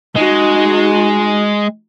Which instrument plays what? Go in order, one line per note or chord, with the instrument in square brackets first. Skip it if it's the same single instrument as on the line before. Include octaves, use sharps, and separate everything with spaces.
[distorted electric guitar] G#3 [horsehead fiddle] D#4 F#4